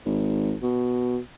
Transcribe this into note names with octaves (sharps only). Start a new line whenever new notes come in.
G#1
B2